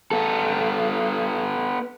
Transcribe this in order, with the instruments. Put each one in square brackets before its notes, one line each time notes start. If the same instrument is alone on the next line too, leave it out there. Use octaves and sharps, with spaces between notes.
[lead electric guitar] B3 A4